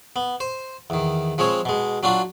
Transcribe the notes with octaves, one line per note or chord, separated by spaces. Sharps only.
B3
C5
E2 D#3
F3 G#3 C4 C#5
B2 G#3
F#3 D4 F4 F#4